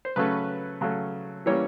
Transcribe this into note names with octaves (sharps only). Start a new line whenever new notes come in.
C5
C#3 F#3 A3 C#4 B4
C#3 F#3 A3 C#4
E3 G3 A#3 C#4 C#5